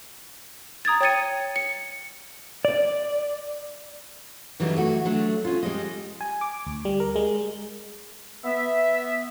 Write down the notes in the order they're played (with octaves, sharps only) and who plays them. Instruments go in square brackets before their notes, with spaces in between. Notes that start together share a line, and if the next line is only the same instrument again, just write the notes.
[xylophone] A#5 D#6 G#6 A6
C#5 G5 G#6 A6 C#7 D#7
C#7
[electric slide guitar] D5
[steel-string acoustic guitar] D3 E3 F#3 G3 D4 D#4
A3 F#4
F#3 A3 D4
C#4 F4
G3 G#3 D#5
[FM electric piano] G#5
D6
D2
G3
A#4
G#3
[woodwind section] B3 E5